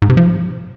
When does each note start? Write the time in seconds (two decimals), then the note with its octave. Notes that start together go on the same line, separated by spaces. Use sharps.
0.02 G#2
0.09 C3
0.17 F3